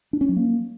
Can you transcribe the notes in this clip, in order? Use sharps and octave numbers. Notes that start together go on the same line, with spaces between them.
D4
C#4
F#3
A#3